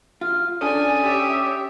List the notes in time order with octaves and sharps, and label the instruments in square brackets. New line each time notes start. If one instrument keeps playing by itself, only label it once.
[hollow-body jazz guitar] F4 [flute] F6
[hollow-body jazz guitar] C#4 D4 A4 [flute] D5 [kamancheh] G#5 [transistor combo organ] D#6
[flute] G4 [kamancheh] C#5 E5